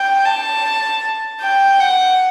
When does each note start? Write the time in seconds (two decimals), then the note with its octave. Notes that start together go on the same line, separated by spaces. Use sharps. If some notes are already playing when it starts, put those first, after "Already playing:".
Already playing: G5
0.25 A5
1.42 G5
1.80 F#5